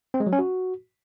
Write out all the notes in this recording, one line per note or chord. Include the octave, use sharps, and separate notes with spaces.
C4
G#3
F#3
C#4
F#4